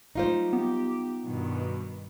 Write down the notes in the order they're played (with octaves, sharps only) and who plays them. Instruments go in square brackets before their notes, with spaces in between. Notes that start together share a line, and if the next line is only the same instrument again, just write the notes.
[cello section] F#3 G3 A3 [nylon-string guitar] D#4 F4 C5
[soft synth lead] B3 [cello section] G4
[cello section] G2 B2 D#3